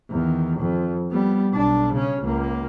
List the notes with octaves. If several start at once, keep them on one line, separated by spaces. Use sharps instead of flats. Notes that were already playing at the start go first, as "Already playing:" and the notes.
E2 D#3
F2
G3 B3
B1 D4
C#3 C#4
C#2 A#3